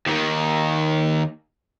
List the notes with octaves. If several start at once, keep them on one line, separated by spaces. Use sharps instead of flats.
D#2 D#3